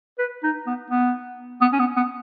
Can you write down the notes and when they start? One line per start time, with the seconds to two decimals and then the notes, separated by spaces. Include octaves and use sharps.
0.19 B4
0.43 D#4
0.67 B3
0.90 B3
1.61 B3
1.73 C#4
1.80 B3
1.97 B3